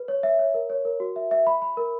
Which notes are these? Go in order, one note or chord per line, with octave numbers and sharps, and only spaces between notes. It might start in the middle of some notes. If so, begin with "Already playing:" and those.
Already playing: B4
C#5
E5
C#5
A#4
C#5
A#4
F#4
E5
E5
B5
B5
A#4